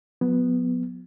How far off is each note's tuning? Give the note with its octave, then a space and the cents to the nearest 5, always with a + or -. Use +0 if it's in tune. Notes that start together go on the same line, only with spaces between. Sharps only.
F#3 -45 B3 +0